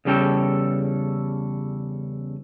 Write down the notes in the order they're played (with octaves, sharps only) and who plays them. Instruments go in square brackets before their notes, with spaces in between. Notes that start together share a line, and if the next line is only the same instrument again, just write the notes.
[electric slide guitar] E2 C#3 G3 C#4 A4 G5